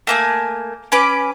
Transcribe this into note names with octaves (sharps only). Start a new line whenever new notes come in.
A3 A#3 G#5
C#4 B4 D6